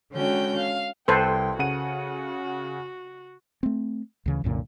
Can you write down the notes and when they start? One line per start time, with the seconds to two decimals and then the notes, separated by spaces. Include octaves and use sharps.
0.13 D3 G#3 C#4 F#4 G5 G6
0.57 F5
1.08 C2 A4 B4 C5 G5 C6 G#6
1.59 C#3 F#4 F#5 D#7
3.63 A3 C4
4.26 D2 C#3 E3
4.44 C2 F#2 A#2 D3